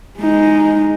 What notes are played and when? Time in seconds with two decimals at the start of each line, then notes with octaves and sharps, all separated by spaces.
0.19 G#3 D#4